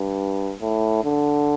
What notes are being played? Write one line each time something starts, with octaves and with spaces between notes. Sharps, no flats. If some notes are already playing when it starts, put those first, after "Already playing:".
Already playing: G2
A2
D3